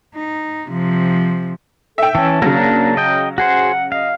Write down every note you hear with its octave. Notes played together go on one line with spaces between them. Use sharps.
D#4
C3 F3
A4 E5 G5
E3 C#4 A5
C#3 F#3 A#3 D4
D#5 G5
F#4 G#4 C5 F#5
D#5 F5